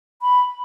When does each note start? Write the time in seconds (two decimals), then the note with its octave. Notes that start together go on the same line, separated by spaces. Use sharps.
0.22 B5